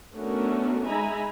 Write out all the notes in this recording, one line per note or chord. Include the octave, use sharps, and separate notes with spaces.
A3 B3 C#4 D4 F#4 A#4
G#3 D#4 E5 G#5 A#5 B5